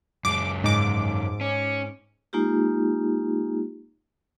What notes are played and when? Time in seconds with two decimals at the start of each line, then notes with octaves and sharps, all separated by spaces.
0.25 F#2 G#3 D6
0.64 G#2 D6
1.41 C#4
2.33 G#3 A#3 D#4 F4 G4